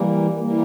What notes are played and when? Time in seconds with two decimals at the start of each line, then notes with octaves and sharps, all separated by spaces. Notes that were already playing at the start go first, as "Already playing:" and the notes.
Already playing: E3 G3 A#3
0.39 E3 G3 A#3